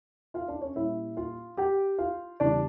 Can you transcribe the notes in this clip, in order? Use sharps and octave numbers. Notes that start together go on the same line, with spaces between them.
F4 F5
D4 D5
C#4 C#5
A#2 G3 C#4 E4 E5
F4 F5
G4 G5
F4 F5
E2 C#3 G3 D4 D5